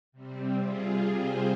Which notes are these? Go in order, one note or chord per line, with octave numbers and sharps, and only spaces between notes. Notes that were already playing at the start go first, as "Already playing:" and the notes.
C3 G3 C4
F4 G#4
G#4 C5